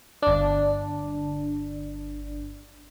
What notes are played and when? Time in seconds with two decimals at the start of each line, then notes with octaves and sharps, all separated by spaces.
0.22 G1 D4